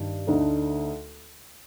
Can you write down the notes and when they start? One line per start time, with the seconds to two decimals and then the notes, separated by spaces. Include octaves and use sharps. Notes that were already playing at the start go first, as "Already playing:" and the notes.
Already playing: G2 D#3
0.27 D2 D3 A3 D#4 A4